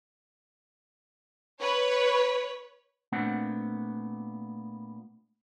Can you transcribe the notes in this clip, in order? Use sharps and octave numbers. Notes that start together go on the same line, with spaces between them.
B4 C#5
A#2 A3 B3 C4 D4 F#5